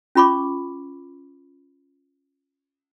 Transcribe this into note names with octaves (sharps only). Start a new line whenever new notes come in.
C#4 F4 B5 C#6 D6